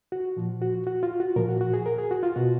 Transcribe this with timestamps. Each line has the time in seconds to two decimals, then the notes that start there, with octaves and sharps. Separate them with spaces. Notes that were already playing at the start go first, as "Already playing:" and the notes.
0.12 F#4
0.37 A#2 F3
0.62 F#4
0.87 F#4
1.03 F4
1.20 F#4
1.36 A#2 F3 A#4
1.49 F#4
1.61 F#4
1.74 G#4
1.86 A#4
1.98 G#4
2.11 F#4
2.23 F4
2.36 B2 F#4